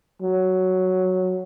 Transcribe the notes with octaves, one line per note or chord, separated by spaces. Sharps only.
F#3